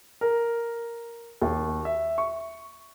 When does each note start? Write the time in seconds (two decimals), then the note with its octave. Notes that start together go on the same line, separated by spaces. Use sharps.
0.21 A#4
1.42 D#2
1.85 E5
2.18 C#6